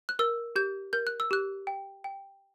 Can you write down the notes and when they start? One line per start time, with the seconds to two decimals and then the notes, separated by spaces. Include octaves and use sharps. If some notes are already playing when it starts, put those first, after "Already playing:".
0.09 F#6
0.19 A#4 E6
0.56 G4 G6
0.93 A#4 G6
1.07 F#6
1.20 E6
1.31 G4 F#6
1.67 G5
2.04 G5